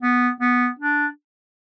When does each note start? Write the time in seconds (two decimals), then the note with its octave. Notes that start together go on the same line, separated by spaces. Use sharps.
0.02 B3
0.41 B3
0.79 D4